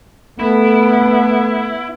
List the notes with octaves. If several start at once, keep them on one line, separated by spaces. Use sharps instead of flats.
A3 B3 E4